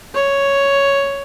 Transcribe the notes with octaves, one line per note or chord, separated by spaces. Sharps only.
C#5